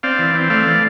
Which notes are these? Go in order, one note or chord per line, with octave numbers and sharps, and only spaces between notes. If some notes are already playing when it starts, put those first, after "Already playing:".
C4 D5 F5
E3
C4
A3 D5 F5
E3